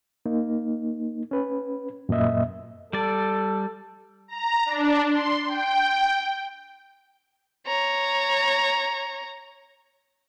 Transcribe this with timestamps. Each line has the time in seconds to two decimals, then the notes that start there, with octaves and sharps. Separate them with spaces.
0.26 A#3 D#4
1.31 C#4 B4
2.09 F#2 A#2 A#3 D#5 E5
2.93 G3 A4 D5
4.28 A#5
4.66 D4
5.10 C6
5.46 G5
7.67 C#5 A#5